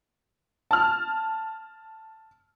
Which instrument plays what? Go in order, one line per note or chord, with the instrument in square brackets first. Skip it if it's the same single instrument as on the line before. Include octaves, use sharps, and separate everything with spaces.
[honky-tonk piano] A5 F6